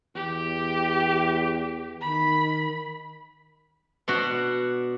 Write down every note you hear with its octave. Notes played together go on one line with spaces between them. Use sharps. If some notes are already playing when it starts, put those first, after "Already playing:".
E2 G4
D#3 B5
B2 D4 F#4